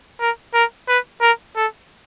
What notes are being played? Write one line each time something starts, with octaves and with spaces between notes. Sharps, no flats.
A#4
A#4
B4
A#4
A4